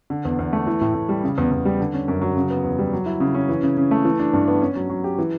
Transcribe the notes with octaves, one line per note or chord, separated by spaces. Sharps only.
D3
E2
E2
A3
E3
A2
A2
G3
C#3
E2
E2
G3
D3
C#4
F#2
F#3
C#3
B3
E2
G3
F#3
E4
C#3
C#4
E3
C#3
C#3
A3
E3
D4
G2
B3
C#4
F#3
F#3
G4
E3